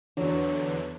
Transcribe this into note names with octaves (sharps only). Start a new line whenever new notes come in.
E2 D3 E3 F#3 B3 D4